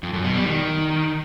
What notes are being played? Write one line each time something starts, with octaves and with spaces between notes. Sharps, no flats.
F2
F#2
B2
G3
D#3